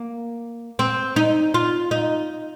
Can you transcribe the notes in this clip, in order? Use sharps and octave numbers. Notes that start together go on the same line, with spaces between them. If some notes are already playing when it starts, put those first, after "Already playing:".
Already playing: A#3
C4
D#4
F4
D#4